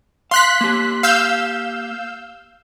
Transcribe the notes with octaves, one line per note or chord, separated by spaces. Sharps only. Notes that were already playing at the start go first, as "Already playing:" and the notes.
F5 C6 F#6 B6
A#3 G4
F5 E6 G6